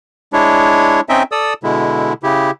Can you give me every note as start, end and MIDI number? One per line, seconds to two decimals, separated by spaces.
0.33 1.01 56
0.33 1.01 62
0.33 1.01 64
0.33 1.01 73
1.09 1.23 60
1.09 1.23 61
1.09 1.23 63
1.09 1.23 75
1.09 1.23 76
1.09 1.23 79
1.32 1.54 69
1.32 1.54 74
1.32 1.54 87
1.32 1.54 88
1.63 2.13 47
1.63 2.13 50
1.63 2.13 56
1.63 2.13 64
2.23 2.51 49
2.23 2.51 64
2.23 2.51 67